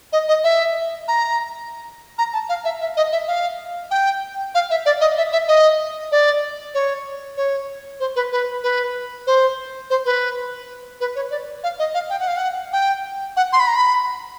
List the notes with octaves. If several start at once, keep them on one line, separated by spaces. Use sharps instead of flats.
D#5
D#5
E5
A#5
A#5
A5
F5
E5
E5
D#5
E5
F5
G5
F5
E5
D5
D#5
E5
E5
D#5
D5
C#5
C#5
C5
B4
B4
B4
C5
C5
B4
B4
C#5
D5
F5
D#5
F5
G5
F#5
F5
F#5
G5
F#5
C6
B5
A#5
B5